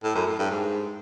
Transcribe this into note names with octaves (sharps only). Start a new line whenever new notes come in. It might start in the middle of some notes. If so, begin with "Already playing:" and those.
A2
F#2
A2
G2
G#2